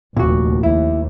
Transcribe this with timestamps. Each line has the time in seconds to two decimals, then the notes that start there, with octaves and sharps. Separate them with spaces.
0.17 F1 D#2 A#2 F#4
0.63 D#2 E4